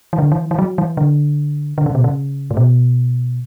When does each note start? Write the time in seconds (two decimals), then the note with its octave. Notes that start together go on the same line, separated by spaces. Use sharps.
0.13 E3
0.19 D3
0.32 E3
0.51 E3
0.59 F#3
0.78 E3
0.97 D3
1.78 D3
1.86 C#3
1.95 B2
2.04 C#3
2.51 A2
2.57 B2